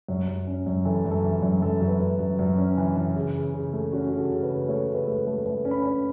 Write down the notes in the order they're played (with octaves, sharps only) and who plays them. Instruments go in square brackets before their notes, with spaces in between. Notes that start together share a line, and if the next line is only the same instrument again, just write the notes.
[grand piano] F#2 C#5
F#2
C#4
F#2
E3 A4
F#2
A4
E3
F#2
F#2 A4
F#2
B4
F#2
F#2
F#2
C#4
E3
E3
C#3
C#3
C#3
A3
C#4 F#4
C#3 F#4
A4
C#3
B4
C#3
A3 C#5
C#3
B4
A3
A3
A3 B4
C#4
B5
C#4